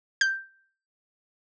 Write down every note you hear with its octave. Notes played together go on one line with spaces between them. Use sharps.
G6